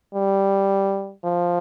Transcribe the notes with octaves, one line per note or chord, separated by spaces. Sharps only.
G3
F3